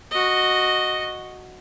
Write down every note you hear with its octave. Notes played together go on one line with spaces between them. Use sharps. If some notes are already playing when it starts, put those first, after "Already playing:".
F#4 D#5